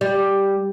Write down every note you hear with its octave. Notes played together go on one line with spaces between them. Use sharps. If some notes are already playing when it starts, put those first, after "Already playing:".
G3